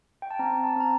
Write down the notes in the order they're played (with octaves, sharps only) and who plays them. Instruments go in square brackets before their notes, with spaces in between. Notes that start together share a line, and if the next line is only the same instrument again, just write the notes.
[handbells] G5
A5
C4 A#5
A5
C4 A#5